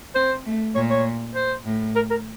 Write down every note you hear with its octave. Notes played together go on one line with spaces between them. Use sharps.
C4 C5
A3
A#2 C#5
C#5
C5
A2
A#4
A#4